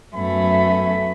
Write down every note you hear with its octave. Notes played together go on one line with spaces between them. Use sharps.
F#2 A3 B3 G#5 B5